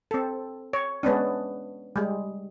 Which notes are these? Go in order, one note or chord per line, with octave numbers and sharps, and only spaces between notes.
C4 A4
C#5
G#3 B3 C#4 D4
G3 G#3